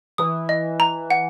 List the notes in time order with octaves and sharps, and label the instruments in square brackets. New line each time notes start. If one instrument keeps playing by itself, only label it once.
[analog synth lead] E3 [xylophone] D#6
[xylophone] D#5
A#5
F#5